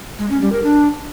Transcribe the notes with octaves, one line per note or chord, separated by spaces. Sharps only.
G#3
C#4
G3
A#4
D4